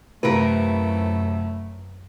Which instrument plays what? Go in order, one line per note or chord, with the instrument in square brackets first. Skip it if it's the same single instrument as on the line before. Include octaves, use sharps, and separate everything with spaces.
[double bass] F#2 [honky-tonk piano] A2 C3 F4 [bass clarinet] A3 [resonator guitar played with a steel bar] A#4 B4